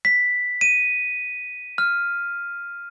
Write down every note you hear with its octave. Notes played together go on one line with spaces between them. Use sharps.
B6
D#7
F6